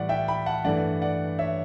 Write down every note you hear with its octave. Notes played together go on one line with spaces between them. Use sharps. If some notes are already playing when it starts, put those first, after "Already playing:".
Already playing: A2 E3 G3 D5 F#5
E5 G5
G5 B5
F#5 A5
G2 E3 A3 D5 F#5
D5 F#5
C#5 E5